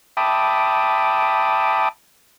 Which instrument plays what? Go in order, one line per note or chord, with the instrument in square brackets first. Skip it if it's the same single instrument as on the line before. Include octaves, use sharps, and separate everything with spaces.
[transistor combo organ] E5 G5 A5 B5 D6 D#6